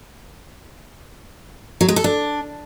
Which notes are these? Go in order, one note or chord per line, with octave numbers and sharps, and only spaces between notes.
F#3
G#3
A4
D4